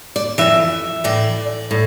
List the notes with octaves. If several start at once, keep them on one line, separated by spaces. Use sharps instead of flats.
D5
F2 E3 E5
A2 E3 D5
A2